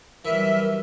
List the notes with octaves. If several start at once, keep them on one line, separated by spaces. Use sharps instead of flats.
E3 F#3 G3 A#4 E5